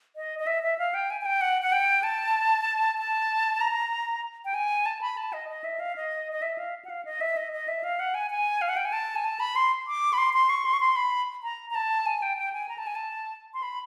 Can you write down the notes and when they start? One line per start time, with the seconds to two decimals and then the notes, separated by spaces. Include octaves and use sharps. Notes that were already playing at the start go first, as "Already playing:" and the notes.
0.16 D#5
0.39 D#5
0.47 E5
0.63 E5
0.78 F5
0.94 G5
1.10 G#5
1.21 G#5
1.25 G5
1.41 F#5
1.62 F#5
1.72 G5
2.03 A5
2.98 A5
3.61 A#5
4.45 G5
4.54 G#5
4.86 A5
5.01 B5
5.17 A5
5.33 D#5
5.49 D#5
5.64 E5
5.80 F5
5.96 D#5
6.32 D#5
6.42 E5
6.58 F5
6.85 F#5
6.90 F5
7.05 D#5
7.21 E5
7.37 D#5
7.52 D#5
7.68 E5
7.84 F5
7.99 F#5
8.14 G#5
8.31 G#5
8.62 F5
8.69 F#5
8.77 G5
8.85 G#5
8.93 A5
9.16 G#5
9.24 A5
9.40 B5
9.56 C6
9.87 D6
10.13 B5
10.18 C6
10.34 C6
10.50 C#6
10.65 C6
10.73 C#6
10.80 C6
10.96 B5
11.43 A#5
11.70 A#5
11.75 A5
12.06 G#5
12.22 G5
12.37 G5
12.53 G#5
12.69 A#5
12.78 A5
12.87 G#5
12.95 A5
13.54 C6
13.63 B5